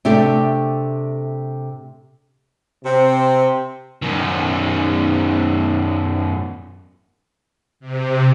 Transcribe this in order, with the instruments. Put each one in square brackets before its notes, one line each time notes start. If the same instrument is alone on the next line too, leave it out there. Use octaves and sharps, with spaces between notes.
[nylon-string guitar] C3 A3 D4 G4
[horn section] C3 C4
[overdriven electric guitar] F#2 D#3
[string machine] C3